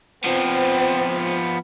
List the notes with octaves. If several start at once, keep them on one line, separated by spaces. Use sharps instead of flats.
F3 B3 C4